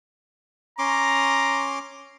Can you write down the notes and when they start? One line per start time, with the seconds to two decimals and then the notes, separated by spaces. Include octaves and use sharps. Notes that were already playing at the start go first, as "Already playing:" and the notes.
0.79 C#4 A#5 C6 D6